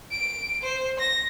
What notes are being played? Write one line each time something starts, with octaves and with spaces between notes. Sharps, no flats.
D7
C5
A#6